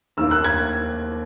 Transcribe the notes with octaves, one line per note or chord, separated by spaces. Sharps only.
D#2 D#3 A#3 E6
F#6
G#6